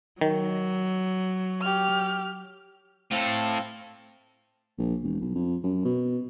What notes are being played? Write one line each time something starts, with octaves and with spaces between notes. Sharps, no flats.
D#3 F#3
G4 F6
A2 C4 A4 F5
A#1
E1
B1
F2
F#2
B2